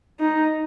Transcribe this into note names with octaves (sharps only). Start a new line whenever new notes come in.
D#4